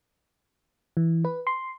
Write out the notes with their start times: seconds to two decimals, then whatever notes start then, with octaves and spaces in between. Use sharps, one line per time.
0.97 E3
1.25 B4
1.47 C6